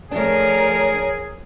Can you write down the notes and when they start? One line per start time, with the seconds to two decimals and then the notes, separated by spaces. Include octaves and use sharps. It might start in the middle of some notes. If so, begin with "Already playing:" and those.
0.11 F3 A3 D4 G#4 A#4 C#5